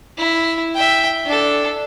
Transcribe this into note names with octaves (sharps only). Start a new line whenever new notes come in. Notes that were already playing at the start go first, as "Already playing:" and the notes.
E4
E5 G5
D4 A4